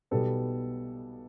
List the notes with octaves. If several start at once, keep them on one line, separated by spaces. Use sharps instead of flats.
B1 B2 G3 B3 A4